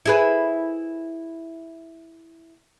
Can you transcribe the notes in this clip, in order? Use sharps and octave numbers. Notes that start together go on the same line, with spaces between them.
E4 G#4 B4